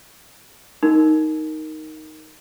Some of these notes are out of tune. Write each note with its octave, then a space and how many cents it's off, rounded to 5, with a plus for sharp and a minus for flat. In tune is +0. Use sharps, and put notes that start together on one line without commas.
D#4 +5 A#4 -10